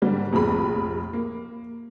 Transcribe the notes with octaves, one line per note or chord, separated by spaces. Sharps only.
G#2 D3 F#3 G3 A#3
F1 A#1 G#4 B5
A#3